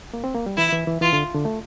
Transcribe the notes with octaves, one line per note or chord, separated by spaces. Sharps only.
A#3
C4
A#3
G3
E3 E4
E3
E3
E3 F4
D3
D3
A3